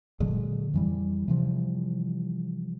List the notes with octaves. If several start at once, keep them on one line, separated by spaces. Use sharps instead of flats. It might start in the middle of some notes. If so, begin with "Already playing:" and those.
A#2 D3 F#3 G#3
F2 E3 G3
C3 E3 F3 G3